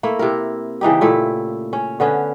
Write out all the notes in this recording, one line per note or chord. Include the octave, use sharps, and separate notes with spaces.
A3 A#3 E4
C3 E4 A#4
C#3 E3 D#4 G4
A#2 A3 E4
C#4
D3 B3 C#4